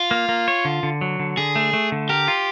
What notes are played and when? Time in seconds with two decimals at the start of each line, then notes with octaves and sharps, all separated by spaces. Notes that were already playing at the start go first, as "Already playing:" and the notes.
Already playing: F4
0.11 A#3
0.29 A#3
0.48 C#5
0.65 D3
0.83 D3
1.01 F#3
1.20 D3
1.37 D3 G#4
1.56 A3
1.73 A3
1.92 D3
2.09 G4 A#4
2.28 F4